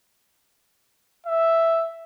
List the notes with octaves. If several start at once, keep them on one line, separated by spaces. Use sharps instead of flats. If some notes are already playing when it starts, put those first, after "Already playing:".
E5